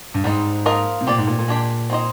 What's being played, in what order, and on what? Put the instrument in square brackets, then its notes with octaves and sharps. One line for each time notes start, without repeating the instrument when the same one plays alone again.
[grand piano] G2
[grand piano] G#2 [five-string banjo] G3 C4 D#4
[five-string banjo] F3 A#3 F4 A#4 D#5
[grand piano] C3
[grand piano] A#2 [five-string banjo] C4 G4 D5
[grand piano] G#2
A#2
A#2
[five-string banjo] G#3 D4 G4
C4 D#4 G#4 C5 D#5